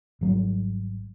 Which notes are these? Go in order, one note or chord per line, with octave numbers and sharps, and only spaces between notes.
G#1 F#3 G3